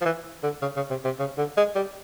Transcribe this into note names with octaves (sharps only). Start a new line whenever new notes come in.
F3
E3
D3
C#3
C#3
C3
C3
C#3
D3
G#3
G3